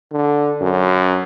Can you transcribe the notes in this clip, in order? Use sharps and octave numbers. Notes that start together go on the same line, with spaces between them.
D3
F#2